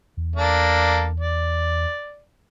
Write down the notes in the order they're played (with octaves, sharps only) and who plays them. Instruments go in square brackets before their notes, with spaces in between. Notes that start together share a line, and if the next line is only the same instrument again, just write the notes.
[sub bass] E2
[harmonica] A#3 D4 A4
D5